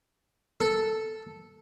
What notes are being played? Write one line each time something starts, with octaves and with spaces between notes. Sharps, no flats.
A4